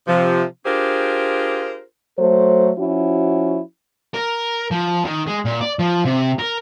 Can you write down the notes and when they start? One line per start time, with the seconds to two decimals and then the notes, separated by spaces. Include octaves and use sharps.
0.07 C3 F3
0.66 D4 F4 G4 G#4 A#4 C5
2.19 F#3 A3 A4 C5
2.78 F3 C#4 E4 F#4
4.14 A#4
4.71 F3
5.05 D#3
5.27 G#3
5.45 A#2
5.61 D5
5.79 F3
6.05 C3
6.39 A#4